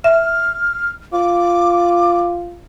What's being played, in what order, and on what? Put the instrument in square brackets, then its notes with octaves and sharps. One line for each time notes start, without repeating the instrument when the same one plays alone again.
[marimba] E5 [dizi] F6
[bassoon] F4 [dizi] D6